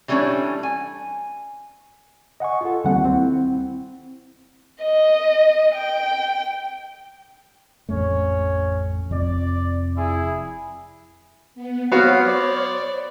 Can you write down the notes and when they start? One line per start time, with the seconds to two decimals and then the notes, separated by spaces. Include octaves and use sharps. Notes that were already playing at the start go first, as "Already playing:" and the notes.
0.08 E3 G3 A3 A#3 C#4 D4
0.63 G#5
2.40 D#5 F#5 G#5 C#6
2.61 F4 A4
2.84 D2 D#3 G3 A#3 C4 F#5
3.05 C4 E4
4.82 D#5
5.75 G5
7.89 A1 F2 A3 C#4 C#5
9.11 F1 F2 D5
9.96 E4 G#4
11.55 B3
11.92 F#3 B3 F#4 C5 C#5 F5
12.26 D5